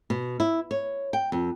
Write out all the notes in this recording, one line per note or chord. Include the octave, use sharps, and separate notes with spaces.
B2
E4
C#5
G5
F2